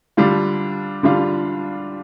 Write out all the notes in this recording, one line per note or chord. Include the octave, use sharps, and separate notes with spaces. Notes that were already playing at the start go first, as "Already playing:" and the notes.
D3 G3 D4 F4
D3 G3 D4 F4